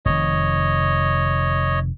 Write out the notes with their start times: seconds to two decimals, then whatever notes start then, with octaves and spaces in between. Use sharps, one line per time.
0.05 F1 C3 D#3 C#5 D#5